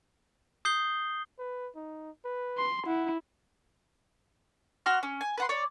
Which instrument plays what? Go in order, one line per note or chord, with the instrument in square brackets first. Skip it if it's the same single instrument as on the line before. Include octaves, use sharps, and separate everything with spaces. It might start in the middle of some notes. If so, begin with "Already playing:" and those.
[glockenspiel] D#6 G6 C7 G7
[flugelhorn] B4
D#4
B4
[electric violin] C6
[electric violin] E4 [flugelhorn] F#5
[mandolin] F#4 C6 F6
C#4
G#5
B4 F#5 C6
C#5 D5